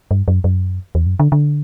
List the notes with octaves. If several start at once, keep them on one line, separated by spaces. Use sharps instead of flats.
G2
F#2
F#2
E2
F#2
D3
D3